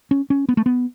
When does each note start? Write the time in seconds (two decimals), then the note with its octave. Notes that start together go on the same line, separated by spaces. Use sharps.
0.11 C#4
0.30 C#4
0.49 B3
0.57 A3
0.66 B3